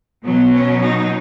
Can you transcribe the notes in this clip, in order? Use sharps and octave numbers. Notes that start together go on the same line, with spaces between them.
B2 F#3 B3
C#4
D#4